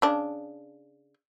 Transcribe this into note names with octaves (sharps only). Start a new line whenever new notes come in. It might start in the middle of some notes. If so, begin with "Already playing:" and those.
C#3 D4